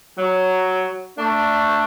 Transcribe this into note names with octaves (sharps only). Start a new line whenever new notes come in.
F#3
A3 D4